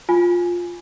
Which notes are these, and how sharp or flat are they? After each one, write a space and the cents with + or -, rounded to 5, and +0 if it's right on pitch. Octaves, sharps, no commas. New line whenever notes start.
F4 +10 G#5 +0